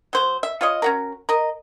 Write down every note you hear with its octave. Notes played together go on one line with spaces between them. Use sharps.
F#3 C5
E5
F4 C#5 D#5
C#4 F#4 A#4
A#4 D#5